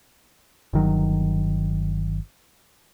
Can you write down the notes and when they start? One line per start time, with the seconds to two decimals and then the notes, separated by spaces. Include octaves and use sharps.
0.73 G1 D#3 F#3